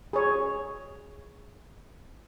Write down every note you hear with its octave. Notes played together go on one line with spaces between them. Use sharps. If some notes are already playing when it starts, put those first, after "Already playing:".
G#4 C#5